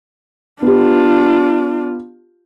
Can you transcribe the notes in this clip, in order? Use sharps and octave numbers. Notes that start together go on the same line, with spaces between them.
B3 D4 F4 G4